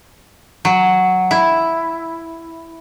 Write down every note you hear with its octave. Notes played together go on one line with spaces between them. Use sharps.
F#3
E4